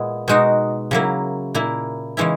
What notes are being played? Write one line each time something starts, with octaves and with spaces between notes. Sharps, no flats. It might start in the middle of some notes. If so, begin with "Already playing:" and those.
Already playing: A#2 G#3 B3 E4
B2 G#3 D#4 F#4
C#3 F#3 A#3 E4
A#2 A#3 E4
C#3 E3 G#3 C#4 E4